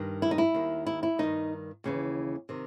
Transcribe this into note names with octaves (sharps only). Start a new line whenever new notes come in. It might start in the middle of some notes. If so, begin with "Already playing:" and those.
Already playing: G2 D#3
E4
D#4
E4
D#2 D#3
E4
E4
G2 D#3 D#4
D#2 C#3 E3
C3 D#3